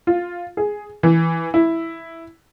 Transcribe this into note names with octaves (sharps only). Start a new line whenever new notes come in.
F4
G#4
E3
E4